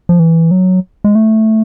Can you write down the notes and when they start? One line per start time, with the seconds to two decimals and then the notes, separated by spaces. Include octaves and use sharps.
0.09 F3
0.19 E3
0.51 F#3
1.04 G#3
1.15 A3